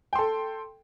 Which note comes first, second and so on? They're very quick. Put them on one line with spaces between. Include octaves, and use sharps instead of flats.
G5 C6 A4